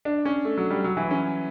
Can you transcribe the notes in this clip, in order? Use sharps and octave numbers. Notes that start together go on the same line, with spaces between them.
D4
C#4
A3
F#3
G3
F#3
E3
C#4